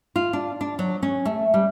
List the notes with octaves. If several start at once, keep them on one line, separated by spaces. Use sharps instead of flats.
F4
D4
D4
F#3
C#4
A3
G3